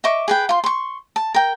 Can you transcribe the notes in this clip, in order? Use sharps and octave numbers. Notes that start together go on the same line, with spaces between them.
D#5 E5 C#6 D6
G#4 B4 G5
F4 C6
C6 C#6
A5
A#4 G5